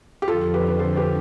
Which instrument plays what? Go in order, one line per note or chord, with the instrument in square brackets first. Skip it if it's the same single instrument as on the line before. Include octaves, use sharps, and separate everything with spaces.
[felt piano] G4
[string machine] F2 D3 F3 [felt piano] F4 A4
[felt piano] G4 B4
B4
A4 C5
C5
G4 B4